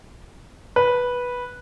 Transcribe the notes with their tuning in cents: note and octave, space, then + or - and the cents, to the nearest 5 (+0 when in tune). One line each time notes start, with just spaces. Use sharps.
B4 -10